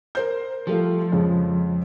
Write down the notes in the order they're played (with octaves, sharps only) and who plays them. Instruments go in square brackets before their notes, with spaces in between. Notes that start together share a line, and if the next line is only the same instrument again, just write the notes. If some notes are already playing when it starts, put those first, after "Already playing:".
[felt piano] A#4 C5 G6
[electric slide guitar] F3 [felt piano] G3 A3 F4
[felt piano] F2 C#3 G#3